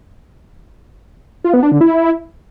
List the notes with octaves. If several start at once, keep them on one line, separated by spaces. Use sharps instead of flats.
F4
B3
D4
D3
E4